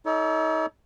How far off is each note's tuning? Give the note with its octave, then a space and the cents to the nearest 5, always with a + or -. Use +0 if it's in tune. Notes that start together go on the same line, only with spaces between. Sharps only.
D#4 +40 A4 +0 C#5 +45